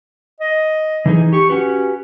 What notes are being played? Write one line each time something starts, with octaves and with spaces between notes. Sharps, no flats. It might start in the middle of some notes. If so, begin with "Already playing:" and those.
D#5
E3 D#4 G#4
G4 C#6
C#4 F#4 G4 B4